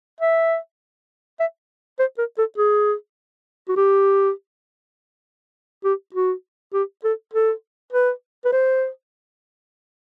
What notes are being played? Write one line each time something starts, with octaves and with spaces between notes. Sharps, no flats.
E5
E5
C5
A#4
A4
G#4
F#4
G4
G4
F#4
G4
A4
A4
B4
B4
C5